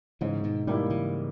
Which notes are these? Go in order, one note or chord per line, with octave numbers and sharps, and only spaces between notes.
G#2 C#3 E3
B2 D#3
B2 D#3 G3 A#3 E4
C#3 E3